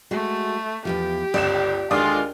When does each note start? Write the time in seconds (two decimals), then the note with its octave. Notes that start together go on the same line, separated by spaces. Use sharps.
0.11 G#3 A3 F#4
0.85 E2 G#2 F3 G4
1.34 G1 C#2 D5 E7
1.91 D#2 D3 G#3 D4 F4 D5 D#6